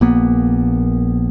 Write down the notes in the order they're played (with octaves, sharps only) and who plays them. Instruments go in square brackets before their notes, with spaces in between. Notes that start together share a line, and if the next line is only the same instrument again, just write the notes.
[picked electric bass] A#1 A#3 B3